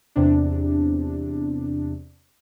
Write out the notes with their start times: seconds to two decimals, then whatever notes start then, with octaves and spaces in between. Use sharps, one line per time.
0.16 E2 C3 D4